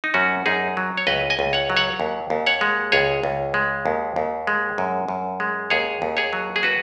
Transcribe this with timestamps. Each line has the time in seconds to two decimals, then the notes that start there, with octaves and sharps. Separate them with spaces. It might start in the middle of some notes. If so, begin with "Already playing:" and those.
0.04 D#4
0.14 F#2 C#4 F#4
0.46 F#2 D#4 G#4
0.77 F#3
0.97 C#5
1.07 C#2 B4 D#5
1.30 D#5 G#5
1.39 C#2
1.53 C#5 F#5
1.70 F#3
1.77 C#5 F#5
2.00 D#2
2.30 D#2
2.46 C#5 F#5
2.61 G#3
2.92 C#2 G#4 C#5
3.23 C#2
3.54 G#3
3.86 D#2
4.16 D#2
4.47 G#3
4.78 F#2
5.08 F#2
5.40 G#3
5.70 D#2 G#4 C#5
6.02 D#2
6.17 G#4 C#5
6.33 F#3
6.56 G#4
6.63 F#4 B4